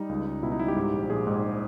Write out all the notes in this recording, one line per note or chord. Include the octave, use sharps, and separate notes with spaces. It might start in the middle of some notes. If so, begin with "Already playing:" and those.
Already playing: G3 D#4
C#2
C#2
B2 E4
D#4
G3 E4
G4
G#2
A#1
A#1 G#4
G#2